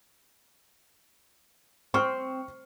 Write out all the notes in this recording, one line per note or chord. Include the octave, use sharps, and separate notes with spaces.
C4 C#6 F6